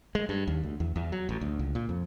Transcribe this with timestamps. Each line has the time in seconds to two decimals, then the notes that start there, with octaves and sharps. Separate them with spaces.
0.15 G#3
0.29 G2
0.47 D#2
0.64 D2
0.80 E2
0.96 E2
1.12 F#3
1.29 A1
1.41 D2
1.59 C#2
1.75 A#2
1.89 F2